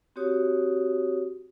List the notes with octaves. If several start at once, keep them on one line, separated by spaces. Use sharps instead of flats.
C4 F#4 G4 C#5 D#6